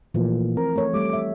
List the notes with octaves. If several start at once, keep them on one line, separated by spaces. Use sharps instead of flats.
A#2 E3 F3 A3
C4 A#4
A3 C#5
G3 A3 D6
E5